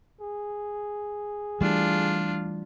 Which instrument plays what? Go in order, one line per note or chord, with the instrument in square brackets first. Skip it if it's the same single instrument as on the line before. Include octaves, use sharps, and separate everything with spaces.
[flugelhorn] G#4
[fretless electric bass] E3 G3 A3 [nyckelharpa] D4 F4